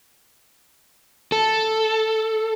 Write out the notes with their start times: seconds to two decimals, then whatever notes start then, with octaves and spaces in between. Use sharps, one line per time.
1.32 A4